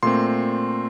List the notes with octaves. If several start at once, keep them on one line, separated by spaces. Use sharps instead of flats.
A#2 A3 C4 C6